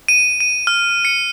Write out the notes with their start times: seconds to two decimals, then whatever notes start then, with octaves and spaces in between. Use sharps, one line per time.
0.08 D#7
0.40 D#7
0.67 F6
1.05 C#7